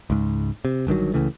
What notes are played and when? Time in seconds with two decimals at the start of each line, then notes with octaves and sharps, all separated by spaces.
0.10 C#2 G#2
0.65 C3
0.87 G1 G2 D#3 F#3
1.14 C#2 C#3 E3 A3